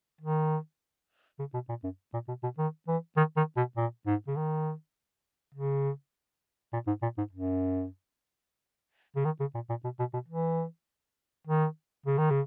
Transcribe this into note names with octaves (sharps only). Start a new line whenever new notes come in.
D#3
C#3
B2
A#2
F#2
A#2
B2
B2
D#3
E3
D#3
D#3
B2
A#2
G#2
C#3
D#3
C#3
A#2
G#2
A#2
G#2
F#2
C#3
D#3
C#3
A#2
A#2
B2
B2
B2
E3
D#3
C#3
D#3
C#3